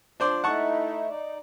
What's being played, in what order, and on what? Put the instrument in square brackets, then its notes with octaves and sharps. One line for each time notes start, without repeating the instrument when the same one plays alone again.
[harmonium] F3 [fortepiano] D4 C5 D5
[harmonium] A3 D#4 E4 [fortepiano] F#5 A5 C#6
[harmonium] D#4 D5